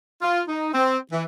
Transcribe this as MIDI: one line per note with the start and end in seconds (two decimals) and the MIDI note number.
0.22 0.41 65
0.48 0.69 63
0.73 0.97 60
1.12 1.23 52